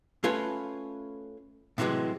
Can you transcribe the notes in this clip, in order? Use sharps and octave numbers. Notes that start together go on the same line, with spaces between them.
A3 C#4 F4 A4 B4 G#5
A2 C3 E3 F#3 G#3